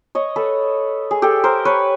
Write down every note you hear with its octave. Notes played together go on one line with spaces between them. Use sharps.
C#5 D#5
A4 B4
G#4
G4 A4
A#4 C5
B4 C#5